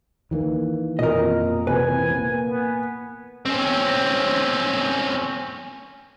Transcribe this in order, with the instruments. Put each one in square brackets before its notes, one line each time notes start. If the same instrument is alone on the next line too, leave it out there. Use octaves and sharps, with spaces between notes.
[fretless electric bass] D#3 E3 A#3
[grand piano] F2 A#2 [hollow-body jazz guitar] A#4 D#5
[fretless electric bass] C3 E3 C4 [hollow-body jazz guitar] B4 [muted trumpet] G#5
[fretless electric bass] A#3 [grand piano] A#4
[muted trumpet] B3
[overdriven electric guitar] C4 C#4